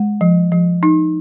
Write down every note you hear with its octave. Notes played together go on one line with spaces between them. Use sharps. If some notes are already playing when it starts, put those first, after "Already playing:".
Already playing: G#3
F3
F3
D#4